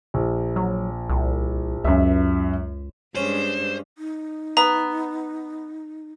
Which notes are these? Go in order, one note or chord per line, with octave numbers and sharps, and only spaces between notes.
A#1
F#3
C2
C#2 F#2 E5
G2 G#3 C#4 D4 C5 E7
D#4
B3 A#5